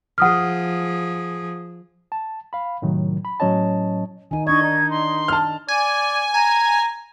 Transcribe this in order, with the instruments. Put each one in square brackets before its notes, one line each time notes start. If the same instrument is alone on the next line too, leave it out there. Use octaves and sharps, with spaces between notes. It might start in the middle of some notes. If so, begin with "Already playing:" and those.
[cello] F3 G#4 [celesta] F#5 D#6 F6
[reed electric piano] A5
F5 B5
A2 C3 D#3 F#3
B5
A2 F#3 C#4 C#5 D#5 A5
[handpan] D#3 D#4 [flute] G#5
[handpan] D4 D#5 [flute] C#6 [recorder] G#6
[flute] D#4
[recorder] C6
[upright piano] A5 F6
[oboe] D5 [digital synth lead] G#5
[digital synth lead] G#5 [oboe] A#5